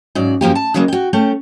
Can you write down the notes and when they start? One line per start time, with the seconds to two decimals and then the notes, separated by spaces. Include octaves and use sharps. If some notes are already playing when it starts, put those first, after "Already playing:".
0.15 G#2 C#3 F#3 D5
0.41 F#2 F3 A#3 G4
0.55 A5
0.74 C#3 E3 F#3 G#3 A#3
0.88 F#4 G5
1.13 A3 C#4 G5